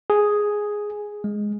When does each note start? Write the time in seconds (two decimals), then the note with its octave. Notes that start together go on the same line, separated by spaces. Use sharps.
0.10 G#4
1.24 G#3